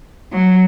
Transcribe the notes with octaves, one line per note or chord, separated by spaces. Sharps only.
F#3